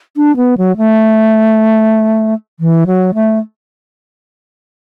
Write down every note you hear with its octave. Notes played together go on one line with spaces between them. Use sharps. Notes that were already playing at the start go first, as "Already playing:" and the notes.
D4
B3
F#3
A3
E3
F#3
A3